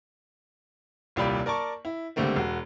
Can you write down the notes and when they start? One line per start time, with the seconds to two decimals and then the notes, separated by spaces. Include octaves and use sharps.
1.16 D#1 C2 F4 G4 D5 B5
1.46 A#4 D5 A5 C#6
1.85 E4
2.16 C#2 D3 G3 A3 A#3 C4
2.36 E1 F#4